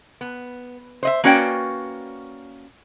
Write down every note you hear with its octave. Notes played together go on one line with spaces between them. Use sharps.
B3
C5 D#5 E5
A#3 C#4 F#4 B4 D5 G5